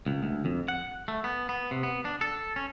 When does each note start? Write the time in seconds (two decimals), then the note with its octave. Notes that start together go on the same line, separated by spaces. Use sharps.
0.06 C#2
0.23 D2
0.45 F2
0.68 F#5
1.08 A3
1.24 B3
1.49 B3
1.71 C3
1.83 B3
2.05 D4
2.21 A4
2.56 C#4